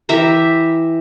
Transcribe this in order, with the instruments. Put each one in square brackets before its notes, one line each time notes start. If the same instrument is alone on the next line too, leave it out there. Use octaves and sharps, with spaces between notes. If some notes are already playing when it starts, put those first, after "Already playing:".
[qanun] E3 G4 E5 A#5